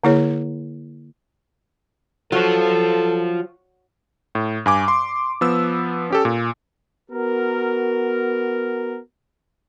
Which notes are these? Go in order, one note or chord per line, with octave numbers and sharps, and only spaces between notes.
D3 A#3 E4 G#4 C#5
F#3 F4 A4 C5
A2
G2 G#5 D6
C6
F3 B3 E6
C#4 G4 A4
A#2
B3 F#4 A#4